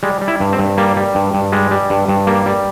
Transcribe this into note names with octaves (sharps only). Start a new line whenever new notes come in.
G3 G#3
G3
E4
G2
C4
G2
G3 A#3
G3
G2
G2
G3 G#3
G3
G2
G2
G3 A#3
G3